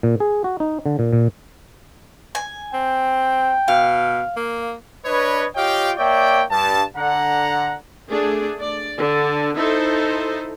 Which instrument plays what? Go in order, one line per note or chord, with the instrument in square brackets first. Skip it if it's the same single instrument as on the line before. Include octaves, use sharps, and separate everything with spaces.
[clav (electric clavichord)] A#2
G#4
F#4
D#4
D3
A#2
A#2
[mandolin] G#5
[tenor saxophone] C4 [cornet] G5
[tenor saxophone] B2 [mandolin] F5
[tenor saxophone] A#3
[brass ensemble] D4 B4 C#5 D#5
F4 G4 C#5 D#5 F5 G5
A#3 C#5 D5 E5 G5
G2 A5
D3 F#5 A#5
[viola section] A3 D4 G#4
D5
D3
D#4 E4 A4 C5